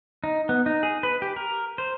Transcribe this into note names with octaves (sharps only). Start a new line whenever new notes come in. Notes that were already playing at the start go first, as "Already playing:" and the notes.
D#4
B3
D#4
G#4
B4
G4
A#4
C5